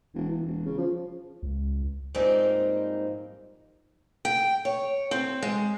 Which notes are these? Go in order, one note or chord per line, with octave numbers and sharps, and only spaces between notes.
E1
E3
E1
C#3
F3
C#2
G#2 F3 G3 A#3 C4 D#4
G5
C#5
C4
G#3